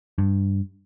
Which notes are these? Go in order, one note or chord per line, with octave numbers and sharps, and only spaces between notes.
G2